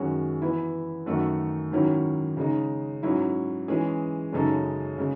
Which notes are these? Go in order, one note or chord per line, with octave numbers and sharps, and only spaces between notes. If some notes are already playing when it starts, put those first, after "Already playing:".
Already playing: F#2 D#3 G#3 C#4 F#4
E3 B3 E4
F#2 D#3 A3 D#4 F#4
G#2 D#3 F#3 C#4 E4
C#3 G#3 D#4
G#2 F#3 C#4 E4
E3 G#3 C#4 G#4
F#2 C#3 G#3 D#4 A4
C#3 G#3